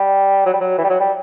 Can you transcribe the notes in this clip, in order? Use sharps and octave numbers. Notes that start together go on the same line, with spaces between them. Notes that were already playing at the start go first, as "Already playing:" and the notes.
Already playing: G3
F#3
G3
F#3
E3
G3
F#3
G3